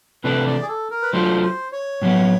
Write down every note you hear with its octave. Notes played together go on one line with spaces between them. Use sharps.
C3 E3 A3 D4 B4
D5
G#4
A4
A#4
B4
F#3 A3 D4 F4 C5
C5
C#5
A2 F#3 B3